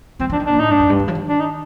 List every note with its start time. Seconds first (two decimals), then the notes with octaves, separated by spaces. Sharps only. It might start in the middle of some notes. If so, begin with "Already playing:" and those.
0.19 F3 C4
0.30 F3 D4
0.40 D#3
0.46 A#2 D4
0.59 A2 D#4
0.70 G2 D4
0.80 F2
0.90 G2
0.99 D#3
1.08 F3
1.15 D#3
1.29 D4
1.40 D#4